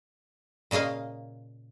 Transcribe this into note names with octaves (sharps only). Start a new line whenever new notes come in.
A#2 C#3 A#3 D#5 F5